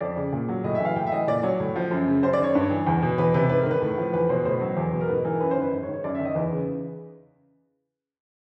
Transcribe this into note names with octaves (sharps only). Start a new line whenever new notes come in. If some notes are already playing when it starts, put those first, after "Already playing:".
F2 D5
C#3
A#2
F#3
A2 D#5
E5
E3 F5
A2 G5
E5
E3 D#5
A#2 D5
F#3 C#5
A2
F3
F#2
C#3
F#2 C5
D5
D#3
C#5
G2
E3
E2
B2
E2 B4
C3 B4
G#2 B4
A#4
D#3
B4
A2
F3
E2 B4
B2 C5
A2 C5
F#3
E2
B2
A#4
G#2 B4
E3 A#4
F#2 B4
C5
D#3
B4
G#2
C#5
D#3
C#5
F#2 D5
E5
D#3
D#5
E2 B4
C#3